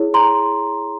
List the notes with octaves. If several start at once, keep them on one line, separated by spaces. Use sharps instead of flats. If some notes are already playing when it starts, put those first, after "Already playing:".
Already playing: E4 G#4 C#5
A#5 C6